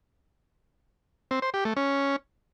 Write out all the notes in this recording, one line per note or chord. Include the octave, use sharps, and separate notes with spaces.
C4
C5
G4
A3
C#4